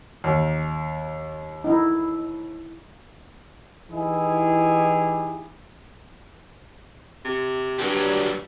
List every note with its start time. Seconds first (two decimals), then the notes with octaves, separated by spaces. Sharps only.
0.24 D#2
1.64 D#4 E4
3.90 E3 D#4 E4 G4 G#4
7.24 C3
7.79 G2 F#3 G3